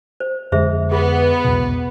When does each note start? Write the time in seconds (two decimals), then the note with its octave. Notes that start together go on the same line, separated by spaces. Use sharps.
0.20 C5
0.52 F2 D3 G#3 G#4 C5 E5
0.92 B3 G#4
1.45 B1 E2 B2